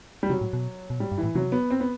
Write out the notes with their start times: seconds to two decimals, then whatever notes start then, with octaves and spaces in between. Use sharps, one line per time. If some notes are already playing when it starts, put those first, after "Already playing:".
0.23 G3
0.29 C3 F#3
0.41 A2
0.53 B2
0.90 B2
1.00 A2 G3
1.12 G2
1.18 E3
1.23 A2
1.35 C3 F#3
1.52 B3
1.70 C4
1.80 B3